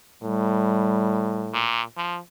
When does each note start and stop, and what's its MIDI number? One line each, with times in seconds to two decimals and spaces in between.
0.22 1.70 45
0.22 1.52 55
1.53 1.81 46
1.97 2.19 53